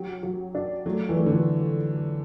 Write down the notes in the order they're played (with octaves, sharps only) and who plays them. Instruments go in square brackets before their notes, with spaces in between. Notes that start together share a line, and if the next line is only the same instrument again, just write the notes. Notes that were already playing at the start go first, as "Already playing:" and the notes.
Already playing: [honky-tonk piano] F#3 G4
F#3
D4
[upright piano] F#3 [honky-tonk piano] A3
[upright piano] E3
[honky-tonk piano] A3
[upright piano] D3
E3